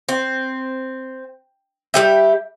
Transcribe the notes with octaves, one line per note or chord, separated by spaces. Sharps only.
C4
G3 G4 E5